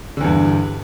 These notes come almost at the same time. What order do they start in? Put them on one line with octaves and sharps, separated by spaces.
D3 E2 G2